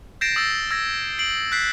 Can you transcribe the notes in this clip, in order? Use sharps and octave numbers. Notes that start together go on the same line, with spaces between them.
G6 A6 A#6 C7 D7 E7
D#6 E6 A6
E6 G#6 A#6
C7 D7 F#7
F#6 G6 B6 C7